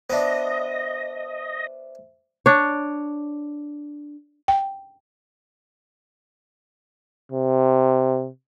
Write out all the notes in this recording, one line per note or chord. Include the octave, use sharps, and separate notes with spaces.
B3 D4 C5 D#5 E5
D4 C#5
G5
C3